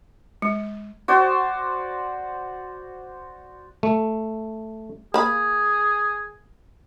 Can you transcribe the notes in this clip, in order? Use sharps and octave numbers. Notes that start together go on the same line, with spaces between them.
G#3
F#4 C5 D5
A3
A#3 G#4 B5